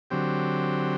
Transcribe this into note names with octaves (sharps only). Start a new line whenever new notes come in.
D3 F#3 C4 G4